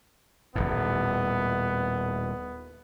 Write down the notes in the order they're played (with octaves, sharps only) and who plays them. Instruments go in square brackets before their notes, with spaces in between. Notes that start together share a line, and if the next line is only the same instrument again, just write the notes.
[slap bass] D#1 G#1 A2 [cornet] B3